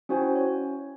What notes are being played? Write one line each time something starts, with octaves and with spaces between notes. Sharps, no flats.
C#4 E4 F#4 C5 G5 G#5
C#5